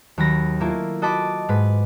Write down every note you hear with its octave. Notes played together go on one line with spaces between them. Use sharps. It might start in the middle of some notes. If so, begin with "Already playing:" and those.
D#2 F#3 B5 A#6
A3 A#3 E4 F4
F#4 D#5 A5 B5 D6
G#2 B4